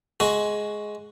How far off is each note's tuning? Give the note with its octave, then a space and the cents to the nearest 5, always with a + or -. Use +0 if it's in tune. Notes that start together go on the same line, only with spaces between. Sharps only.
G#3 +10 F#4 +0